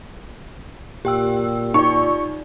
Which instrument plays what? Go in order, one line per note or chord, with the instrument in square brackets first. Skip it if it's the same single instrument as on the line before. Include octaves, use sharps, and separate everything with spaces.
[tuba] A#2 [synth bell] G4 G5 E6
[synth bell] D#4 F4 D5 [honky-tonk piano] C#6